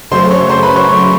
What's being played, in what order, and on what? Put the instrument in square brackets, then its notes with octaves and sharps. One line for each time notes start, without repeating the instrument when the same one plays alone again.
[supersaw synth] F#2 C#3 F#3 A3 [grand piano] C5 C6
[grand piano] C#5 C#6
C5 C6
B4 B5
C#5 C#6
C#6
C6